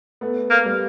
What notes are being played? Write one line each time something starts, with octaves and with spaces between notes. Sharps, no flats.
A3 B3
A#3
G3 A3